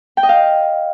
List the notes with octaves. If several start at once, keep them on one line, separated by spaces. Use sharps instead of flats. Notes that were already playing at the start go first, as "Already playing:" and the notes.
G5
D#5
F5